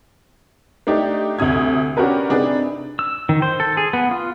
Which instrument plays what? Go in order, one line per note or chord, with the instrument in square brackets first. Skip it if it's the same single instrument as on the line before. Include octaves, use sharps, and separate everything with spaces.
[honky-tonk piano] A3 D4 D#4 G4
D2 C3 D#6 G#6
C#4 D4 F#4 G4 A#4 B4
C3 D4 D#4 G#4 B4
[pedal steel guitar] E6
D#3
C5
A4
G#4
B3
F4